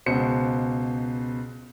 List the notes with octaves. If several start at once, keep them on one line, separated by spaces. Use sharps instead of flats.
C#2 B2 C5 C#7